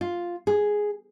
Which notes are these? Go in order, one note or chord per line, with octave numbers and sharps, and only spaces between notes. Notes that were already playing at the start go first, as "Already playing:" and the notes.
F4
G#4